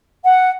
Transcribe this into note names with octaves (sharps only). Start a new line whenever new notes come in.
F#5